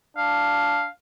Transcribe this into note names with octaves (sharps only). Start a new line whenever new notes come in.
D4 F5